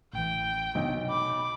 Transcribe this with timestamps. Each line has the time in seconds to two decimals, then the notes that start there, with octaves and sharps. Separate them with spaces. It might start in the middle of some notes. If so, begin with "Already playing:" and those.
0.13 A1 E3 G5
0.75 B1 C3 B3
1.09 B5 D6